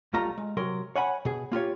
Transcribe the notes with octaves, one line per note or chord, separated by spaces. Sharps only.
B1 G3 A3 F4 A#5
G#3
C3 F#3 A#4 C6
C#5 F#5 G#5 B5
B2 G#4
A#3 F4 G4 C#5